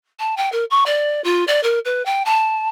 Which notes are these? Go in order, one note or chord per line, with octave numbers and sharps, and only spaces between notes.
A5
G5
A#4
C#6
D5
F4
D5
A#4
B4
G5
A5